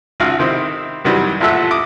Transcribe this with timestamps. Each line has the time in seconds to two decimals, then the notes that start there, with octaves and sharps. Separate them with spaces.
0.20 G#1 C#3 F4 F#4 F5
0.39 C3 D#3 C4 E4
1.05 F#2 C3 D#3 E3 F#3 G3
1.40 A1 A#2 F4 A4 E5 F#5
1.71 D6 D#6